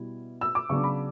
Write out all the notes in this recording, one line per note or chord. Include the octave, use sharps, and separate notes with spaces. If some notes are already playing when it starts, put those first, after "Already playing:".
Already playing: B2 G3 E4
E6
D6
C#3 F#3 B3 D4 C#6
B5